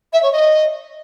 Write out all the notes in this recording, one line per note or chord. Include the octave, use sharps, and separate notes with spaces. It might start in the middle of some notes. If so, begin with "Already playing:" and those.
E5
C#5
D#5